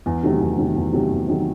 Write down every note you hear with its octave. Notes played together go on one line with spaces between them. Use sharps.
E2
C3 D#3 F#3 A3
E2
C3 D#3 F#3 A3
E2
C3 D#3 F#3 A3
E2
C3 D#3 F#3 A3